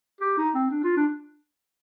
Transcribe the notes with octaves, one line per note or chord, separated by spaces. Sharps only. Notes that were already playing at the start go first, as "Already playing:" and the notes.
G4
D#4
C4
D4
F4
D4